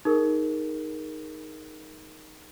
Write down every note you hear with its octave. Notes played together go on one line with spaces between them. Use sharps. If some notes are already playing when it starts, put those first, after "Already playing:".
D#4 G#4 A#4